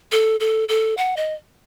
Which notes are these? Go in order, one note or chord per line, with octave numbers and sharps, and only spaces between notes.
A4
A4
A4
F#5
D#5